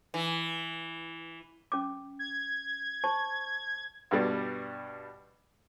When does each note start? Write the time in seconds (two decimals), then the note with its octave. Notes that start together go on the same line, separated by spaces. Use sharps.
0.14 E3
1.72 C#4 D6
2.19 G#6
3.04 C5 A5 C#6
4.11 G2 B2 G3